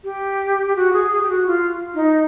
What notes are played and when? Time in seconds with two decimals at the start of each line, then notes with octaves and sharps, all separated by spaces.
0.04 G4
0.76 F#4
0.93 G#4
1.12 G#4
1.23 G4
1.29 F#4
1.47 F4
1.95 D#4